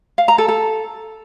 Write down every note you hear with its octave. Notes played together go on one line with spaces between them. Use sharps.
F5
A#5
A4
A4